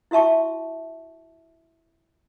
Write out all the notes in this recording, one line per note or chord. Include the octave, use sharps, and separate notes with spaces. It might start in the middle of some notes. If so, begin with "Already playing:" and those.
E4 F#4 E5 A5 C#6